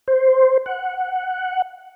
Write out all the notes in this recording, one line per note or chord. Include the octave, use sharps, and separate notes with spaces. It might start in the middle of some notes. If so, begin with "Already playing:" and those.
C5
F#5